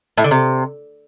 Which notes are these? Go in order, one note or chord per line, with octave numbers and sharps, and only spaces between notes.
A2
D3
C3